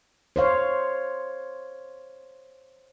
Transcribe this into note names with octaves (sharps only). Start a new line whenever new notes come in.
C5 C#5 F5